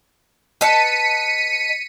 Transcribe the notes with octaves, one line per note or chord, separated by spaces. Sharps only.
B4 D#5 A5 B6 C#7 D#7